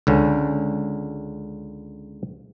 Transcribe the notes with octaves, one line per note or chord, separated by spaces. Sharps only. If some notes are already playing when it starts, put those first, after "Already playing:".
C#2 D3 C#4